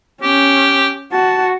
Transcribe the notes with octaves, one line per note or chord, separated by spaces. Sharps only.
C#4 G4
F#4 A5